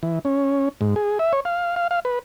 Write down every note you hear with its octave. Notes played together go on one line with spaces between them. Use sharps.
E3
C#4
G#2
G#4
E5
C#5
F5
F5
F5
B4